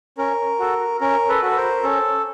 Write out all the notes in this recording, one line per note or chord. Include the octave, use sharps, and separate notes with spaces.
C#4 A#4
F#4 A4
C#4 A#4
A4 B4
F#4 A4
B4
A#4 C5
C#4 A4